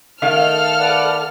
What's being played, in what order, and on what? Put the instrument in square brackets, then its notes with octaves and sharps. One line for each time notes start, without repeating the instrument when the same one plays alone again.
[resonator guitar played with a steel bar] D#3 A3 [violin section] A4 F6 [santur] F5
[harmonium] B4 D5 F#5